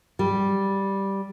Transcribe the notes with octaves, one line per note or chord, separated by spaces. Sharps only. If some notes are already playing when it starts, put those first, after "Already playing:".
G3